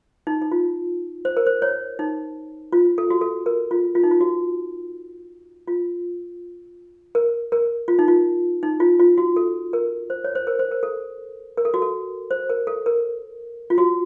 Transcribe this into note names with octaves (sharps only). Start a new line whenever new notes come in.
D#4
D#4
F4
C5
A#4
C5
C#5
D#4
F4
A4
F#4
A4
A#4
F4
F4
D#4
F4
F#4
F4
A#4
A#4
F4
D#4
F4
D#4
F4
F4
F#4
A4
A#4
C5
C#5
C5
A#4
C5
A#4
A4
A#4
A4
F#4
A4
C5
A#4
A4
A#4
F4
F#4